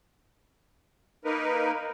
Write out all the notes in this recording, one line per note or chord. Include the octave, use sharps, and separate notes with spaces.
A#3 D#4 A#4 B4